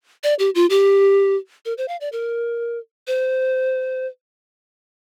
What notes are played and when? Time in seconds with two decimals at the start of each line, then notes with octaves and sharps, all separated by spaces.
0.23 D5
0.39 G4
0.55 F4
0.70 G4
1.65 A#4
1.78 C5
1.88 F5
2.01 D5
2.12 A#4
3.07 C5